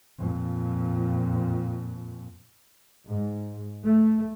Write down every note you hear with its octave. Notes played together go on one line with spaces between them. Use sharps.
F2 A#2
G#2
A3